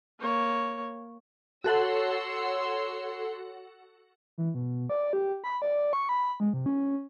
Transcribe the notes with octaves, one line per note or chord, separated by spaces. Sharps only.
A#3 C#5
F#4 A4 C#5 F#5 C6 E6
E3
B2
D5
G4
B5
D5
C#6
B5
G#3
C3
C#4